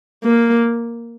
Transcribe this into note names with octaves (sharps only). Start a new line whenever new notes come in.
A#3